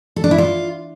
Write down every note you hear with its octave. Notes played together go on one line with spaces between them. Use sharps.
A4
D4
E4
F4